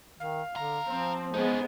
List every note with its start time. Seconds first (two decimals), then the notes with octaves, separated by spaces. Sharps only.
0.20 D#3 F5
0.56 D3 A4 A#5
0.87 F3 C4
1.34 G#3 B3 C#4 D#4 C5